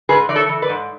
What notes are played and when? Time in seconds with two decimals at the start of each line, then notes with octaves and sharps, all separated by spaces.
0.09 G#2 G#4 B4
0.29 E3 D5
0.36 A4 C#5
0.49 E3
0.62 B4 D5
0.69 G#2